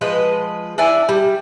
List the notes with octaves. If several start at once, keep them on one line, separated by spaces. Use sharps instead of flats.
F3 G#3 B4 D#5
D4 E4 D5 G#5
G3